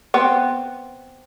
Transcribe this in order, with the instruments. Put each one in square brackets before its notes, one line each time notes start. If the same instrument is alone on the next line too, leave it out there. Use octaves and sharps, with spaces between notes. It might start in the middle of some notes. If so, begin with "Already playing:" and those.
[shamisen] B3 C4